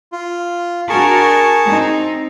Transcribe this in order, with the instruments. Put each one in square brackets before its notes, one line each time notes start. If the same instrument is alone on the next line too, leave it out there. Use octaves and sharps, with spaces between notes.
[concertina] F4
[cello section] D4 F#4 A#4 [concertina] G#4 A5 C#6
[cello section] C4 D#4